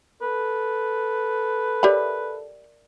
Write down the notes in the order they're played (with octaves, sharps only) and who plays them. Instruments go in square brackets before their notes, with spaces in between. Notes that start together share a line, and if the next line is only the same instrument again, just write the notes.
[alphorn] A4 [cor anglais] B4
[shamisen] G4 C#5 B5 [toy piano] A#4 D5 E5